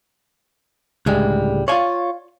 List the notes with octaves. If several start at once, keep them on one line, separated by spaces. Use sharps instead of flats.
C#2 A2 D3 G3 G#3
F4 C#5 D5 F5 G#5